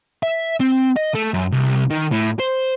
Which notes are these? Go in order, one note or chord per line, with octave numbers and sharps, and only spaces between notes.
E5
C4
D#5
A3
F#2
C2
D#3
A2
C5